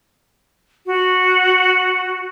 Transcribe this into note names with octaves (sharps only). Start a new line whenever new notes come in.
F#4